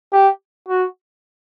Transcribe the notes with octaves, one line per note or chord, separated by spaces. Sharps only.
G4
F#4